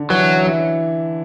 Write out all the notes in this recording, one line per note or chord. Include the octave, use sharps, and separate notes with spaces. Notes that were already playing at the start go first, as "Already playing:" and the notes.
Already playing: D3
E3 F#3
E4